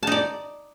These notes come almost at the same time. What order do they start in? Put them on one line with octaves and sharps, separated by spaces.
A5 D#4 D5